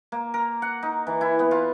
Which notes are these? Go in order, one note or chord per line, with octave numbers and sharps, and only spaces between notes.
A#3
A#4
F#5
D#4
E3
E4
B3
F4